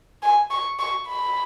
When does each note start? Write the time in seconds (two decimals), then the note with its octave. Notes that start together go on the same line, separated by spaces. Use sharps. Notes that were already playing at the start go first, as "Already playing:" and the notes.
0.23 G#5
0.51 C#6
0.79 C#6
1.08 B5